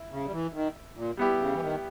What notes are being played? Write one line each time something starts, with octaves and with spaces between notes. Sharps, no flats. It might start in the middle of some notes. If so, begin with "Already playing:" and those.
Already playing: E4
C#3
G3
E3
D#3
A#2
G3 B3 E4 G4
C#3
E3
D#3